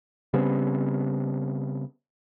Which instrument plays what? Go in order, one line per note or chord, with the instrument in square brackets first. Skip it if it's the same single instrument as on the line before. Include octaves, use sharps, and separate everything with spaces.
[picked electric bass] C#3 G3 B3 C4